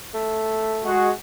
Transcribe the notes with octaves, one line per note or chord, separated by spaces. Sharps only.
A3
G#3 F#4 G#4